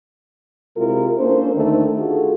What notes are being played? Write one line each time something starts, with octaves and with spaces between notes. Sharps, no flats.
C3 G#3 E4 F4 G4 A#4
A#3 C#4 D4 A4 C5
D2 D#3 A3 D4 D#4
F4 F#4 G#4 A4